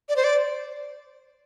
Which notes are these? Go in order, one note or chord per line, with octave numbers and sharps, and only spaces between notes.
D5
C5
D5